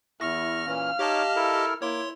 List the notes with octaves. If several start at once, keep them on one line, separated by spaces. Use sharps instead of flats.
E2 E4 C#6 F6 A#6
A#2 E3 C#4 F5
D#4 G4 C#5 D#5 A5 D6
E4 A4 A#4
A#3 E4 C#5 C6 D6